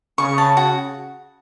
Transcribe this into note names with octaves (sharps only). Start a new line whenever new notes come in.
C#3 C#6
A5
F#4